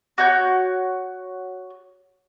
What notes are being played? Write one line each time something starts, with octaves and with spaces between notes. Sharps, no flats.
F#4 C#5 G6